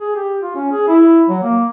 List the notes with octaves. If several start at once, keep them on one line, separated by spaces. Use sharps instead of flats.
G#4
G4
F4
C#4
G#4
E4
F#3
A#3